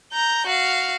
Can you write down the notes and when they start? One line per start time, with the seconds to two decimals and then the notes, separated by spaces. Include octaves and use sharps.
0.13 A#5 G6
0.47 F#4 F5